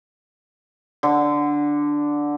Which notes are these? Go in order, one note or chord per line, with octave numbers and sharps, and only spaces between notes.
D3